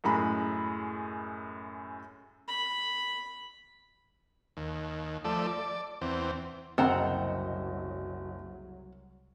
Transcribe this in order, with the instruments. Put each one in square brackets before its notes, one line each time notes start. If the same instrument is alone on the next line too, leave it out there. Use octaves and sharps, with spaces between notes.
[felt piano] F#2 A2 G#3 G#4 A#5 B5
[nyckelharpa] B5
[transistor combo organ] D#2
F3 A3 A4 D5
D5
E2 C4
[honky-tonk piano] F#1 D#5 [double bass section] C2 F#3 [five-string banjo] C4 F#5 A#5